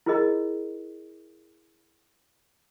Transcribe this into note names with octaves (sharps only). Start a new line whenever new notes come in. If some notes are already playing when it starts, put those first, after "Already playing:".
E4 F4 G#4 A#4 D#5